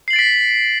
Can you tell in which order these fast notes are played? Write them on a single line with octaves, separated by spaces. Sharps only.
C7 F#7 A6 D7 B6